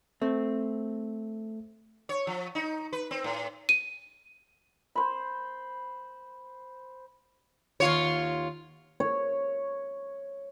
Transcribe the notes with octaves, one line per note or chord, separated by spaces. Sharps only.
A3 C4
C#5
F3
D#4
B4
C4
A2
D#7
C5 B5
D#2 F4 C#5
C#5